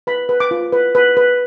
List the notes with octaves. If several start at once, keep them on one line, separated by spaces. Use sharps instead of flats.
B4 B5
B4
D6
F4
B4
B4
B4